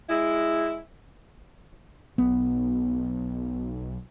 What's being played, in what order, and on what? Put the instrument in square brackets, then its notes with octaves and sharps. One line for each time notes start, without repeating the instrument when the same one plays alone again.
[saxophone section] G#3 E4
[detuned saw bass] B1 [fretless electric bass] B3